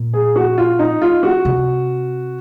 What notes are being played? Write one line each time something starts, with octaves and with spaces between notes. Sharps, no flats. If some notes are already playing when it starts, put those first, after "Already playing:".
Already playing: A#2
G#4
F#4
F4
D#4
F4
F#4
C3